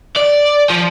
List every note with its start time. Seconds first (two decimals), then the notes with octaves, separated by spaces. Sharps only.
0.16 D5
0.70 F3